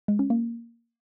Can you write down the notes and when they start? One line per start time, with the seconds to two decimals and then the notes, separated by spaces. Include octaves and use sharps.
0.08 G#3
0.19 C#4
0.30 A#3